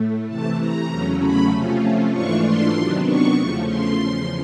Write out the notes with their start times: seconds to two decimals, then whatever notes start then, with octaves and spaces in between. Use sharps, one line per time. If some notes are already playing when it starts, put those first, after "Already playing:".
Already playing: A2 A3
0.27 C3 E3 A3 A5
0.58 A#5
0.89 E2 C#3 F#3 A3 C#4
1.20 B5
1.51 C3 F3 A3 C#4 F4
2.11 G#2 E3 A3 D4 F4 C#6
2.43 C6
2.74 C3 D#3 F#3 B3 D4
3.05 C#6
3.35 E2 C#3 F3 A3
3.66 C6
3.97 E2 C#3 F3